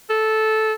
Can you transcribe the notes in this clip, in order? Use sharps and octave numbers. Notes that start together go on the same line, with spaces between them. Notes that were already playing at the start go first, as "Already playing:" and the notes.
A4